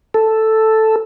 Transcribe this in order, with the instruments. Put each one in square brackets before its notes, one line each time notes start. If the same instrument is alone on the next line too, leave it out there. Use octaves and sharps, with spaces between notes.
[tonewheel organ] A4